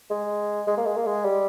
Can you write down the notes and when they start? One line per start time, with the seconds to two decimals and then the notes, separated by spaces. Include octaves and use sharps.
0.10 G#3
0.67 G#3
0.77 A#3
0.86 G#3
0.97 A#3
1.07 G#3
1.25 G3